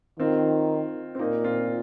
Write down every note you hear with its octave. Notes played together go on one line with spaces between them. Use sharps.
D#3 C4 F4
C4
A#2 A#3 D#4
C4 F4